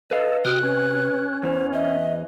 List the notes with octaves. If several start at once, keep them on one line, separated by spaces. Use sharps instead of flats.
A4 B4 D#5 F5
C3 F#4 G5 D#6 F6 F#6
C#4 B4
E2 E3 C5
D#5 E5